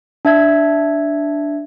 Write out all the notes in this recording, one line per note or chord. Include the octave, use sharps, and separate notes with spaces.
D4 E5 G#6